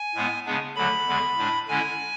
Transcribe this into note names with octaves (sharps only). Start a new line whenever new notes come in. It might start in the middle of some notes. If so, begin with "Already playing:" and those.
Already playing: G#5
A2 G#3 B3
C#3 G#3 B3 D4
D2 D3 F#3 B5
E2 D3 G#3
A2 G#3 D4
D3 G#3 C#4 E4 G#5